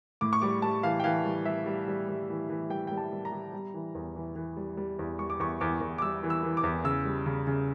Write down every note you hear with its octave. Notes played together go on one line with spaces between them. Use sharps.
A2 D6
C#6
G3 D6
G3 A5
E3 F5
G5
E3 F5
G3
G3 E5
G3
G3
G3
E3
E3
G3 G5
G3 G5
A5
G3
A#5
G3
G3
E3
E2
E3
E3
G3
G3
E2
G3 C#6
D6
E2 C#6
E2 D6
E2
D6
G3 E6
E3
E6
E3
D6
E2
C#3 E6
G3
C#3
C#3